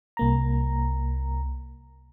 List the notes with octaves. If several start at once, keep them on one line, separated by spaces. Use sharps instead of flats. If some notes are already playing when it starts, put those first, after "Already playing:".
C2 A#3 A#5